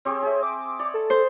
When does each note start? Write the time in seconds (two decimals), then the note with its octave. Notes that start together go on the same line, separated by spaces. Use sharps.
0.05 C4 G4 G#4 C#5
0.22 G#4 E5
0.43 D6
0.79 C#5 D5
0.94 A4
1.10 C5